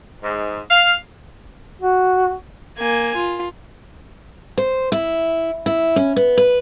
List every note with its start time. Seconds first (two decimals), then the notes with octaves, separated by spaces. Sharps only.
0.23 G#2
0.70 F5
1.82 F#4
2.78 A#3 G#5
3.16 F4
4.58 C5
4.92 E4
5.66 E4
5.96 C#4
6.16 B3
6.37 B4